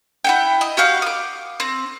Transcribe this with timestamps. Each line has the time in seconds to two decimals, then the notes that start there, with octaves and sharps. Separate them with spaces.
0.24 E4 F#5 G5
0.61 D#5
0.77 F#4 G4 F5 F#5
1.02 D6 D#6
1.60 C4